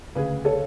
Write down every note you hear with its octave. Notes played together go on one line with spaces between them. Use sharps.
D2 C#3 G#4 B4
A4 C#5